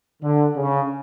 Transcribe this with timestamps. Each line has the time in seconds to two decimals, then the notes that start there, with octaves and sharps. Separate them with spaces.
0.22 D3
0.56 C#3